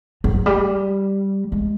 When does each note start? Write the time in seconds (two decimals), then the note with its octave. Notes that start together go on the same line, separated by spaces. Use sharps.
0.24 F#3
0.46 G3
1.52 G#3